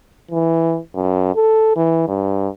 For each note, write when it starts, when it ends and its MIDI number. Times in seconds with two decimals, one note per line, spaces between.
0.31 0.78 52
0.95 1.32 42
1.35 1.72 69
1.76 2.05 52
2.08 2.49 43